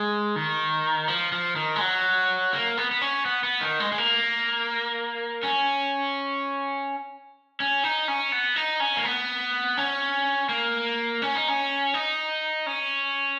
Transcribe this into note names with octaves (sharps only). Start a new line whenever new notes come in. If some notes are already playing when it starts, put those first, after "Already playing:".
Already playing: G#3
D#3
F3
F3
D#3
G#3
F#3
A#3
B3
B3
C#4
B3
B3
D#3
G#3
G#3
A#3
C#4
C#4
D#4
C#4
B3
D#4
C#4
A#3
B3
C#4
A#3
C#4
D#4
C#4
D#4
C#4